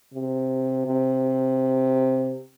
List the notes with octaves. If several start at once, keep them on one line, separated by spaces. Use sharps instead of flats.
C3
C3